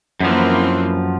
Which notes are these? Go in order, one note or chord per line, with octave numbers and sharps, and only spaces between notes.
F#2 E3 F3 A#3 C4